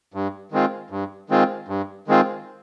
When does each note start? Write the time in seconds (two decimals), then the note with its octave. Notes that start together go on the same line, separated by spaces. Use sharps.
0.14 G2
0.52 D#3 G#3 C4 F4
0.90 G2
1.30 D#3 G#3 C4 F4
1.68 G2
2.08 D#3 G#3 C4 F4